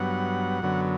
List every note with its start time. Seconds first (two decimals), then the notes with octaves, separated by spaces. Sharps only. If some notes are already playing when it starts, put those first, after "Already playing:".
Already playing: G2 F#3 B3 F#5
0.62 F#2 D3 F#3 B3